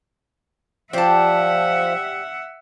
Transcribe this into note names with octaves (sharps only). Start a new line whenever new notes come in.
F3 G4 C5 D5 E5 F#5 A5